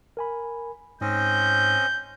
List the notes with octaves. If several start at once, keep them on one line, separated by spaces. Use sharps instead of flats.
A#4 G#5 B5
G#2 C4 C#4 D#5 G6